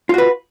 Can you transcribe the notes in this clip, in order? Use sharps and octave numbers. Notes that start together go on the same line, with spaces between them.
F4 F#4 B4